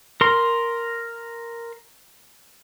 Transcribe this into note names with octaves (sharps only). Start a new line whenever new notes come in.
A#4 C6